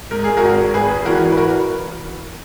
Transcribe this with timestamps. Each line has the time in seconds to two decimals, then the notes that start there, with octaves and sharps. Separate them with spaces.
0.11 G#2 A#4
0.24 G#4
0.37 F#4 A#4
0.43 G#1
0.74 G#1 G#4 B4
1.05 E3 F#4 A#4
1.32 B4
1.37 F#4 A#4